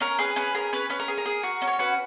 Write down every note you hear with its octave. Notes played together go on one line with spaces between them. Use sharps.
C#4 A#4
G#4 B4
C#4 B4
G#4 A#4
C#4 B4
C#4 B4
A#4
G#4
A#4
G#4
F#4
C#4
C#5
F#4 B4